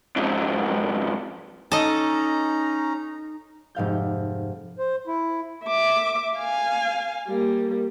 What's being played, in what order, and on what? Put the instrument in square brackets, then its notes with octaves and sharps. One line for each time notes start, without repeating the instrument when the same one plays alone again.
[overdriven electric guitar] F2 G#2
[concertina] C#4 A#5 [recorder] D#4 [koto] A4 D#5
[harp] F1 G#2 F5 G6
[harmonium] C5
E4
[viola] E5 D6
F5 G#5
G3 A#3